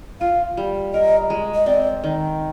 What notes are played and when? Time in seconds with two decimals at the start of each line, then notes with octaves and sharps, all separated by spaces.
0.21 F4 F5
0.57 G3
0.93 A#4 D#5
1.30 G#3
1.55 D#5
1.66 C4 D5
2.04 D#3